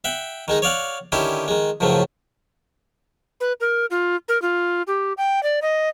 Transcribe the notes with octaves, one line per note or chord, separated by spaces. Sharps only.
E5 F#5 G5
D#3 G#3 D#4
C#5 D5 F5 F#5
D3 D#3 C#4 E4 G4 C6
D#3 G#3
C#2 F#2 A2 F3 A3
B4
A#4
F4
A#4
F4
G4
G5
D5
D#5